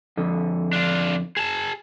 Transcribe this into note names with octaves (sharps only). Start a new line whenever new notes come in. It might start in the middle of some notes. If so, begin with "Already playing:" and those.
F2 D3
D4 F4
G#4 A5